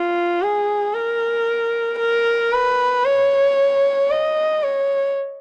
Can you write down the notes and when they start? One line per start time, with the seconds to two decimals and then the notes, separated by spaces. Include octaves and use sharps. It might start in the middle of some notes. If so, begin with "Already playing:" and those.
Already playing: F4
0.42 G#4
0.94 A#4
1.99 A#4
2.53 B4
3.05 C#5
4.11 D#5
4.63 C#5